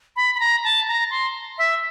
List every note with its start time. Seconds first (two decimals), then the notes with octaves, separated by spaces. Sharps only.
0.16 B5
0.35 B5
0.40 A#5
0.64 A5
0.88 A#5
1.11 C6
1.58 E5